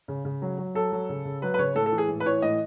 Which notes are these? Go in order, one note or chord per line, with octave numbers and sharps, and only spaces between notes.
C#3
C#3
F#3
F#3
F#3 A4
F#3
C#3
C#3
F#3 B4
B4
C#3 C#5
A2 A4
A4
E3
G#4
A2
B4
E3 C#5
A2 D#5